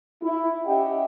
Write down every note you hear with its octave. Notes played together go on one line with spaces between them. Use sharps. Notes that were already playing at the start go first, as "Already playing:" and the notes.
E4
C#4 G4 D#5 E5 F#5 G5